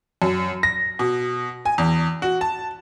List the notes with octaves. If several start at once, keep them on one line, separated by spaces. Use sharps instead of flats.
F#2
A#6
B2
G#5
E2
F#4
A5